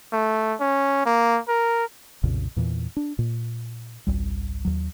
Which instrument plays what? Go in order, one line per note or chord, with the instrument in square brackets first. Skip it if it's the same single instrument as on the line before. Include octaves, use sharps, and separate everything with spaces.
[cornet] A3
C#4
A#3
A#4
[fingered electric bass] B1 F2 A#2 C#3
E2 A#2 E3
D4
A#2
G#1 C#2 G3
D#2 F#3